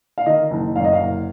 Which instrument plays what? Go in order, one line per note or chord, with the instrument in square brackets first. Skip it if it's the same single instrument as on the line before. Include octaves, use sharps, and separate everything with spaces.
[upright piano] F5
D#3 D#5
F#1
F#2 F5
D#5
F5
F#1